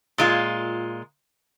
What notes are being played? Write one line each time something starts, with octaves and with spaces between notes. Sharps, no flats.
A#2 G#3 F4